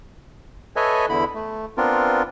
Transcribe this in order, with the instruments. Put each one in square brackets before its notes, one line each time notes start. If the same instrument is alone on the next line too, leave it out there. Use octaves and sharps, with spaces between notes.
[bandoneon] A4 B4 C#5 D#5 E5 G#5
E2 D3 E4 B5
A3
B3 C4 D4 F4 A#4